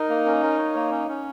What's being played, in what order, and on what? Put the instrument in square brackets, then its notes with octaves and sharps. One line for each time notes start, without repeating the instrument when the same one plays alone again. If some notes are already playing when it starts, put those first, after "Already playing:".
Already playing: [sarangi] D#4 [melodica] A#4
[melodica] A#3
C#4
A#4
C#5
A#3
C#4
C#4